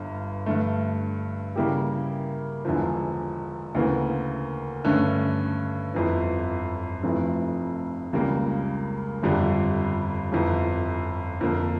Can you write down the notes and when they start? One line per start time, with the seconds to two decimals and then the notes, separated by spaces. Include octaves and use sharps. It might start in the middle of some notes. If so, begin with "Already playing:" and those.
Already playing: G1 G2
0.46 G2 D3 A3
1.56 C#3 G3 A#3 E4 G4
2.65 E1 E2 D3 F3
3.75 D2 C#3 E3 A#3
4.84 G2 D3 A3 C#4
5.94 G1 F2 E3
7.03 F1 F2 E3 A3
8.13 C#2 C#3 G3 A#3
9.23 G1 F2 D3 G3
10.32 G1 F2 E3
11.41 F2 D3 F3 A#3